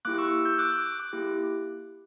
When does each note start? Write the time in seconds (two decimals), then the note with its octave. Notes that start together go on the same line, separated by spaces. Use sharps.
0.05 A#3 E4 G4 D6 F#6
0.18 C#6 E6
0.45 E6 G6
0.59 D6 F#6
0.72 D6 F#6
0.86 D6 F#6
0.99 D6 F#6
1.13 A#3 E4 G4